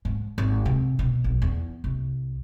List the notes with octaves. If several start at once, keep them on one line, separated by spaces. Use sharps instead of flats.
G#2
G#1
C3
B2
B1
E2
C2